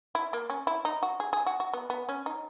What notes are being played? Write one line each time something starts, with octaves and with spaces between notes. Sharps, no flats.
E4
A#3
C#4
E4
D#4
F#4
G#4
G#4
F#4
F#4
B3
B3
C#4
D#4